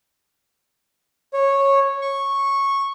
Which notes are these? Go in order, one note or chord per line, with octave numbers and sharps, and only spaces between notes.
C#5
C#6